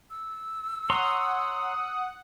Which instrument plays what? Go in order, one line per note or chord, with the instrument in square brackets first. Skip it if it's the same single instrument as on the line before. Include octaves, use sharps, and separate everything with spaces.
[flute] E6
[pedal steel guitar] C#5 A#5 C6 [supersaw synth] F#5 [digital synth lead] D#6